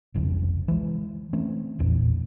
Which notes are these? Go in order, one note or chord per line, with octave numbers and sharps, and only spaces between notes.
F#1 C2 F2 C#3
E3 G#3
E3 A3 C4 C#4
A1 E2 A#2